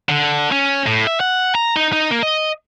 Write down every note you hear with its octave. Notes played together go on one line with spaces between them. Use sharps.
D3
C#4
A2
E5
F#5
A#5
D#4
D#4
A#3
D#5